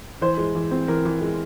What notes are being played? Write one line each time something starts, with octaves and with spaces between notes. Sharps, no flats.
E3 C5
G#3
E3
C4
E3 A#4
E3
G#3